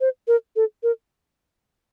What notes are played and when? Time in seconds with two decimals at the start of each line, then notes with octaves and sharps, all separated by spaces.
0.01 C5
0.28 A#4
0.56 A4
0.83 A#4